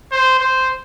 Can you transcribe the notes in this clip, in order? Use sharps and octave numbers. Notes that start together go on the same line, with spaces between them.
C5
C5